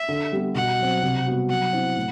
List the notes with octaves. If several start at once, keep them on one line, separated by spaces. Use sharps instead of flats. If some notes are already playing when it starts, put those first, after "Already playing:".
Already playing: E5
D3
G3 B3
B2 F#5
F#3 C4
C3
G3 B3 F#4
F#3 F#5
C4 E4
A2